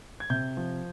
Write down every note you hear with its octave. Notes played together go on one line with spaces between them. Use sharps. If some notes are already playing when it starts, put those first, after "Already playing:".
G#6
C3 G6
F3